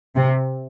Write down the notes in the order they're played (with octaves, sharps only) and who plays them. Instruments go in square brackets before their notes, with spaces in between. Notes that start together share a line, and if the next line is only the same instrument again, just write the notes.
[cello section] C3